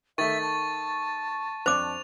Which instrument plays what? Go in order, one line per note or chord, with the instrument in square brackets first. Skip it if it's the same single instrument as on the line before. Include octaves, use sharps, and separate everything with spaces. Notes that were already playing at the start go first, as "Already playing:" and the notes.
[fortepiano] D#3 A3 [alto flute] E5 [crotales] C#6 A6
[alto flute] A5
[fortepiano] F2 D4 [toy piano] C5 D6 [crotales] F7